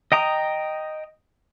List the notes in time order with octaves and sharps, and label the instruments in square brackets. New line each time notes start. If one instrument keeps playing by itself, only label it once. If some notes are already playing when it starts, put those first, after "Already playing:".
[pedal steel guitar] D#5 G5 A#5 D#6